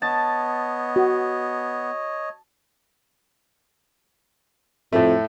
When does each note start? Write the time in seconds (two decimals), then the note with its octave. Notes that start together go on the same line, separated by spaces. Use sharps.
0.02 B3 C#5 D#5 A5
0.96 F#4
4.93 F2 A2 A3